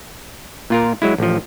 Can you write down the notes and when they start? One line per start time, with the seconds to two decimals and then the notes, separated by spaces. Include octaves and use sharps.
0.70 A#2 F4 A#4
1.02 F#3 G#3 E4
1.18 A1 F3